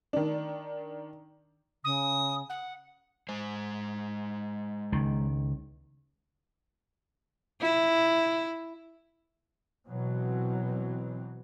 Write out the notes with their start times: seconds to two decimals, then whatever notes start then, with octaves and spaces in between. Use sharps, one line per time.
0.13 D#3 D4
1.84 C#3 D#6
2.49 F#5
3.29 G#3 C5
4.92 C#2 D#3
7.61 E4
9.87 B2 E3 F#3 C4